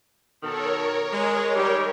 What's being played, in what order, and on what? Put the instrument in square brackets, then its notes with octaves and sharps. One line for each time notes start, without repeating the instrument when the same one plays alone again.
[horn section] B2 D#3 A4 [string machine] A#4 C#5
[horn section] G#3
D#3 G3 G4